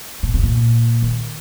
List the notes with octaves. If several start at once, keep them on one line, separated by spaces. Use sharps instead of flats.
A#2
C3
A#2
D#3